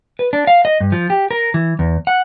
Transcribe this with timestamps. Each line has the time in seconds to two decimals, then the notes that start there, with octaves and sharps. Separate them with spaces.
0.19 B4
0.33 D4
0.47 F5
0.65 D#5
0.80 G2
0.92 F3
1.10 G4
1.31 A#4
1.54 E3
1.79 E2
2.07 F#5